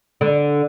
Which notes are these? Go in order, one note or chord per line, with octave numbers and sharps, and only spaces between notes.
D3